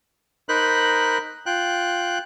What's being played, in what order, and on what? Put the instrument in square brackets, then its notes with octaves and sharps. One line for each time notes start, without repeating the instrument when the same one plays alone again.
[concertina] D#4 A#4 C5 B5 F#6
F4 G5 F#6